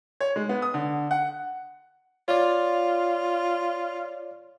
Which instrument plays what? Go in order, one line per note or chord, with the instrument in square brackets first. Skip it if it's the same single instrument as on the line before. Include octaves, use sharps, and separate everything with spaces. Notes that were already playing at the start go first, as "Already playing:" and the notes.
[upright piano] C#5
G#3
B3
D#6
D3
F#5
[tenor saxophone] F4 [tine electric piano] C#5 D5